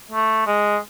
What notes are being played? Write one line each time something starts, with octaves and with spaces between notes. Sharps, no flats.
A3
G#3